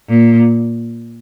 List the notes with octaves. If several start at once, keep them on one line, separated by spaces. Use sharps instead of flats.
A#2